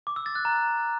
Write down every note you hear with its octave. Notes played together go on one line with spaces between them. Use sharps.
D6
E6
A6
F#6
A#5